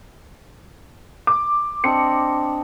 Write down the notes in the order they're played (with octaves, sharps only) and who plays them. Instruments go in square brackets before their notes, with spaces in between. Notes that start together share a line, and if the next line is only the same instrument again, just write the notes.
[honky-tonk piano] D6
[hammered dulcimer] C4 D4 D#5 [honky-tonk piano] C#7